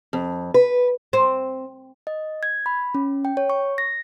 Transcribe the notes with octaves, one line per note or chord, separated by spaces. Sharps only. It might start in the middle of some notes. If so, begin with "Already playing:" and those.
F2
B4
C4
D#5
G#6
B5
C#4
G5
C#5
C#6
A#6